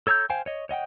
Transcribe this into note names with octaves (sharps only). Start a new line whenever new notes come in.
A4 C#5 A#5 E6 G6
C5 F5 G5 G#5
C#5 D#5
C#5 D#5 F#5 G5